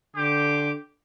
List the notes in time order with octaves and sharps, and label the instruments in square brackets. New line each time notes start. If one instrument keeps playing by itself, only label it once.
[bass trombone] D3 [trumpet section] G4 C5 D6